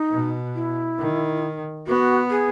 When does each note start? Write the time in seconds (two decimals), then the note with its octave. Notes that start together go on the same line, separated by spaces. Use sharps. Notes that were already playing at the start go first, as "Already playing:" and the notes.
Already playing: D#4
0.11 B2
0.55 E4
0.99 D#3
1.87 B3 F#4
2.30 G#4